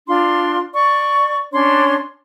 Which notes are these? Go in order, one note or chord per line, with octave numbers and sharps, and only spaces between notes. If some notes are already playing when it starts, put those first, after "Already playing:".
D4 F4 C6
D5 C#6
C#4 D4 C#5 C6